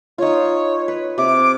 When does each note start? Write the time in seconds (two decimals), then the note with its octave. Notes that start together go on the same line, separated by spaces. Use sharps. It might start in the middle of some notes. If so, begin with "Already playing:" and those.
0.18 D#4 F4 C#5
0.88 B4
1.18 C3 D6